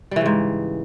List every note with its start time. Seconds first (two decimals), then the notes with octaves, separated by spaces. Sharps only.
0.11 G3
0.16 E3
0.21 C#3
0.26 G#2